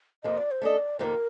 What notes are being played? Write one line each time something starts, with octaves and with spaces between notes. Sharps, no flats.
F2 C3 F3 A#3 D#5
D5
C5
A3 D4 A4 D5 D#5
F2 C3 D#3 A#3 A#4 C5